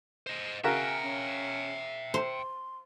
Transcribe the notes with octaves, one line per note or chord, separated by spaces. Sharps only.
C5 D#5
C#3 F#4 A#4 E5 G5 G#5
C#4
C5 C6